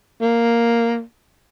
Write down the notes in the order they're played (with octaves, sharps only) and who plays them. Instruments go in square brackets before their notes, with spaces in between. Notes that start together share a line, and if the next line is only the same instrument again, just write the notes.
[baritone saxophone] A#3